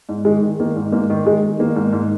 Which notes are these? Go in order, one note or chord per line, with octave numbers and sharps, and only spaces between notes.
G#2
D#3 G#3
D#3
D#3 A#3
G#2
G#2 A#3
D#3
D#3 G#3
D#3
D#3 A#3
G#2
G#2